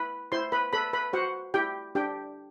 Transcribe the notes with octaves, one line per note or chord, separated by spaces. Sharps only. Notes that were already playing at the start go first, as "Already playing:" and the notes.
Already playing: E4 B4 B5
E4 C5 C6
B4 B5
A4 B4 B5
B4 B5
F#4 C5 F#5
E4 G4 G5
D4 G4 G5